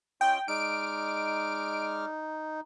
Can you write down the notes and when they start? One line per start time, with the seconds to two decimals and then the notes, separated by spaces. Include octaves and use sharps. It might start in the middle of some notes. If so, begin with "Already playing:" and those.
0.21 C#4 F4 D#5 G5
0.48 G#3 D#4 D5 F6 D7